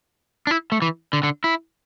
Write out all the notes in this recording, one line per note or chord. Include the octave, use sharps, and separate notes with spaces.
D4
E4
A3
E3
D3
D3
E4